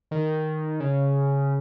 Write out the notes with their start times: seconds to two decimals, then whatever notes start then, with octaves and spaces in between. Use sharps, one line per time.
0.11 D#3
0.80 C#3